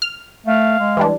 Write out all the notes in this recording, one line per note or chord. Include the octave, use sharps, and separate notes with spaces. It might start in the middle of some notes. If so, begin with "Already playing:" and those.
F6
A3 F5
G#3
E3 G3 D4